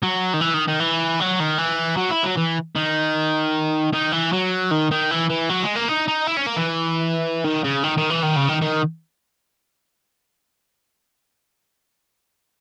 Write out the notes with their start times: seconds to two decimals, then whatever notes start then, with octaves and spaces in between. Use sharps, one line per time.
0.03 F#3
0.34 D#3
0.41 E3
0.54 D#3
0.68 D#3
0.80 E3
1.20 F#3
1.40 D#3
1.58 E3
1.97 F#3
2.11 E4
2.24 F#3
2.37 E3
2.76 D#3
3.93 D#3
4.12 E3
4.32 F#3
4.71 D#3
4.91 D#3
5.11 E3
5.30 E3
5.49 F#3
5.63 G#3
5.75 A#3
5.88 D#4
6.08 D#4
6.27 E4
6.37 C#4
6.47 A#3
6.56 E3
7.44 D#3
7.64 C#3
7.83 D#3
7.98 D#3
8.10 E3
8.23 D#3
8.36 C#3
8.49 D#3
8.62 D#3